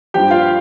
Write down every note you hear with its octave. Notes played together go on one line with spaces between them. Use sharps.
G2 F3 G4 G5
F4 F5